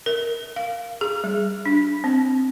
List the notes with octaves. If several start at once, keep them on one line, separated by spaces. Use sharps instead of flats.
A#4
F5
G#4
G3
D4
C4